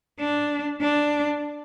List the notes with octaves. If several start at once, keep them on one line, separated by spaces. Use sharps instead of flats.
D4
D4